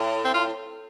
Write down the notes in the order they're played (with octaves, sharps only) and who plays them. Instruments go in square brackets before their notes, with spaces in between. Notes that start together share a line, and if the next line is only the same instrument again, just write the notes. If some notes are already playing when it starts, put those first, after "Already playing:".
Already playing: [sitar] A2
[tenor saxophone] C4
F4